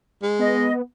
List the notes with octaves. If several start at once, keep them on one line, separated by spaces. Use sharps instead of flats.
G#3
B3 D#5